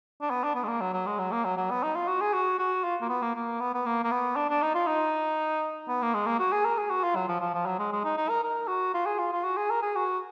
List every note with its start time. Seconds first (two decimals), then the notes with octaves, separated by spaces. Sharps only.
0.21 D4
0.30 B3
0.44 D4
0.55 B3
0.64 G#3
0.68 A#3
0.81 F#3
0.93 F#3
1.06 G#3
1.19 F#3
1.32 A#3
1.45 F#3
1.57 F#3
1.71 B3
1.83 D#4
1.96 F4
2.08 F#4
2.21 G#4
2.33 F#4
2.59 F#4
2.84 F4
3.01 A#3
3.10 B3
3.22 A#3
3.35 A#3
3.60 B3
3.74 B3
3.86 A#3
4.04 A#3
4.11 B3
4.36 D4
4.50 D4
4.62 D#4
4.75 F4
4.87 D#4
5.88 B3
6.02 A#3
6.14 G#3
6.26 A#3
6.39 F#4
6.52 G#4
6.65 A#4
6.78 G#4
6.90 F#4
7.04 F4
7.16 F#3
7.28 F3
7.41 F3
7.54 F3
7.66 F#3
7.79 G#3
7.93 G#3
8.04 D#4
8.17 D#4
8.30 A#4
8.43 A#4
8.68 F#4
8.94 F4
9.06 G#4
9.19 F4
9.32 F4
9.44 F#4
9.57 G#4
9.70 A#4
9.82 G#4
9.96 F#4